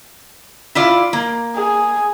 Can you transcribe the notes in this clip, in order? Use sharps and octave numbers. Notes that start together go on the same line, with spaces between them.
E4 F4 D5
A#3
G#4